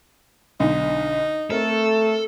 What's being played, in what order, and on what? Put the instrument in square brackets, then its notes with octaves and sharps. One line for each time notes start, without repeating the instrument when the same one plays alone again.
[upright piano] B1 D3 [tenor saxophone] D#4
[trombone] A3 [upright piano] C4 A#4 [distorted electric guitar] A4